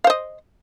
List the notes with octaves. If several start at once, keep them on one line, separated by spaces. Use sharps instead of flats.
C5 D#5 F5